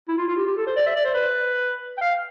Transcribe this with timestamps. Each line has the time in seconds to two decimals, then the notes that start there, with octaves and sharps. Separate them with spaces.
0.08 E4
0.17 F4
0.28 F4
0.37 G4
0.47 G4
0.57 A4
0.67 C5
0.76 D5
0.86 E5
0.96 D5
1.05 C5
1.14 B4
1.97 G5
2.01 F5